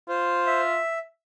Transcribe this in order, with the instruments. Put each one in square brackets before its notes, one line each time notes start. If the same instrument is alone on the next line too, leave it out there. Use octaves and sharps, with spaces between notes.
[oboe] F4 [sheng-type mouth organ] C5
[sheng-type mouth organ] E5